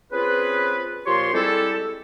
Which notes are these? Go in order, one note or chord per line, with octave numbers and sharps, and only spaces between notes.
C4 C#4 F4 G#4 B4
A#2 F3 F4 G4 C#5 C6
G3 G#3 C4 E4 G4 A4